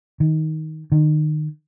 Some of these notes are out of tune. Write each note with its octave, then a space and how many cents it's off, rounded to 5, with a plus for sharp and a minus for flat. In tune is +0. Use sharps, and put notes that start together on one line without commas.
D#3 +15
D#3 -30